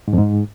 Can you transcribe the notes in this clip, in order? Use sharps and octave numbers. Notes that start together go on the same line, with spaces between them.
G#2
F2
G#2